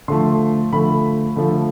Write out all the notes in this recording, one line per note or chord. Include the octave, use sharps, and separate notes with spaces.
D3 F3 A3 C6
D3 F3 A3 B5
D3 F3 A3